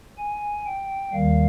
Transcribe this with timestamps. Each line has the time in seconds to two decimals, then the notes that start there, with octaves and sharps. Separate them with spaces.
0.18 G#5
0.66 G5
1.13 D#2 D#3 G3 F5